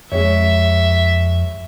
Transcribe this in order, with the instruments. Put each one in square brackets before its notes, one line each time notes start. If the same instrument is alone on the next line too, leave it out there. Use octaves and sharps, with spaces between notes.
[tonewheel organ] F2 [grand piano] G#3 G#4 C#5 [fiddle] E5